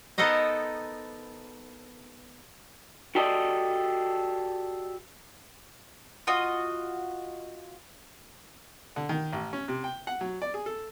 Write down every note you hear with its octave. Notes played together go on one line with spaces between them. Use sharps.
B3 D#4 A4 A#4 C5 D#5
F#4 G4 A4 D5 D#5
F4 F#4 D#5
D3
D#3
A1
C#4
C3
G5
F#5
F#3
D5
G#4
A4